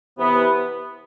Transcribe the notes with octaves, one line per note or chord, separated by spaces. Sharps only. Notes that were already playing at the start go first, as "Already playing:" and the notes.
C3 E3 B3